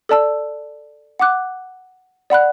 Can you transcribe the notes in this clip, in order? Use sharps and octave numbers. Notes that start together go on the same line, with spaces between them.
A4 D5 A5 E6
F#5 D6 F#6
D5 F#5 B5 F#6